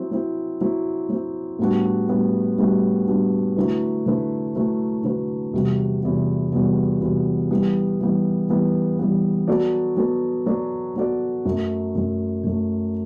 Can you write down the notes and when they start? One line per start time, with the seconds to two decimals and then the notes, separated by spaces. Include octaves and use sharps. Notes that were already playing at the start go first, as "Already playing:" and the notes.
Already playing: F#3 C4 E4
0.11 F#3 C4 E4
0.61 F#3 C4 E4
1.09 F#3 C4 E4
1.59 A2 G3 B3 D4 F#4
2.08 A2 G3 B3 D4 F#4
2.58 A2 G3 B3 D4 F#4
3.07 A2 G3 B3 D4 F#4
3.57 D3 F#3 A3 E4 B4
4.06 D3 F#3 A3 E4 B4
4.55 D3 F#3 A3 E4 B4
5.04 D3 F#3 A3 E4 B4
5.53 E2 C3 G3 B3 F#4
6.03 E2 C3 G3 B3 F#4
6.52 E2 C3 G3 B3 F#4
7.01 E2 C3 G3 B3 F#4
7.50 E3 G3 B3
8.00 E3 G3 B3
8.49 E3 G3 B3
8.99 E3 G3 B3
9.48 F#3 B3 F#4 A4 D5
9.97 F#3 B3 F#4 A4 D5
10.46 F#3 B3 F#4 A4 D5
10.96 F#3 B3 F#4 A4 D5
11.45 F#2 F#3 A3
11.95 F#2 F#3 A3
12.44 F#2 F#3 A3